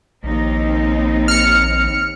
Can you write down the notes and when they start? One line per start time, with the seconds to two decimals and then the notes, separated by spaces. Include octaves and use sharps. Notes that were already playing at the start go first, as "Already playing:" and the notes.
0.23 A#1 D#2 C4 D#4
1.28 F6 C#7